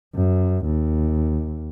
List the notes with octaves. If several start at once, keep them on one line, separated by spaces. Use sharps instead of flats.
F#2
D#2